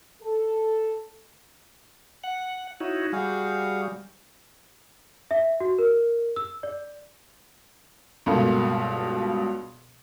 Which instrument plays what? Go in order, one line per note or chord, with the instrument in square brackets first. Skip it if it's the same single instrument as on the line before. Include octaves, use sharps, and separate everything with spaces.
[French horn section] A4
[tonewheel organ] F#5
[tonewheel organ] D#4 E4 F#4 [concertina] C#5
[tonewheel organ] G3 [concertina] F#4 G#4 F5
[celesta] E5
F#4
A#4
E6
D5
[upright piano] C#2 G2 B2 A#3 A4 F5